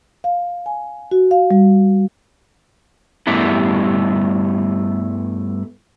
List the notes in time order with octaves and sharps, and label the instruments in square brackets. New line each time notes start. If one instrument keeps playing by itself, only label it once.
[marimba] F5
G#5
F#4
F5
G3
[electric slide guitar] G2 G3 A3 B3 E4